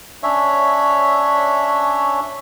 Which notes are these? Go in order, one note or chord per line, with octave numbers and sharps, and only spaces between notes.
C#4 D4 C#5 E5